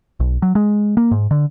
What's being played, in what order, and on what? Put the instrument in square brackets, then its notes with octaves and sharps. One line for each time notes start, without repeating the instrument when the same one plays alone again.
[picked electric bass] B1
F#3
G#3
A#3
G#2
D3